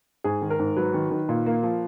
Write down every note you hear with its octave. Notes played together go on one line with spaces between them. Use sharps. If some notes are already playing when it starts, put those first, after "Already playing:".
G#2 G#4
D#3
A#4
G#2
F#3 B4
D#3
D#3
A#2
A#3
F3